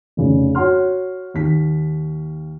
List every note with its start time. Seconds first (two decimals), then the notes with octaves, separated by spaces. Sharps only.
0.17 F1 C#3
0.55 F#4 C#5 F#5 C6 F6
1.34 D#2 B6